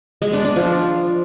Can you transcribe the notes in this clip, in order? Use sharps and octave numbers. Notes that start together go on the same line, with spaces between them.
G#3
D4
D4
F3